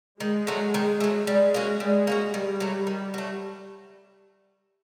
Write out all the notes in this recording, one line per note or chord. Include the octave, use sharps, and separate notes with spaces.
D#3 G#3
F#3 A3
D#3
F#3 A3
G3 G#3
A#3 C#4 F#4
G3 G#3
A#3 C#4 F#4
D#3 G3
F#3 A3
D#3
F#3 A3